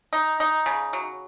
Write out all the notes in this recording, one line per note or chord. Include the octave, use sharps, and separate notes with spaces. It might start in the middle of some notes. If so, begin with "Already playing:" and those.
D#4
D#4
C#3
F#3